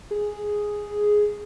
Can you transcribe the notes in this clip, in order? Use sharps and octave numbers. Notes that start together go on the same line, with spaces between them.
G#4